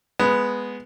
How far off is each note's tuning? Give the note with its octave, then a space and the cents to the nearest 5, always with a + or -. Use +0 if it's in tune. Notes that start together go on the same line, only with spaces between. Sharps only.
G#3 +0 B3 +0